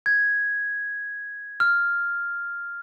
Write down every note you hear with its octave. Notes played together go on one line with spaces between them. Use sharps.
G#6
F6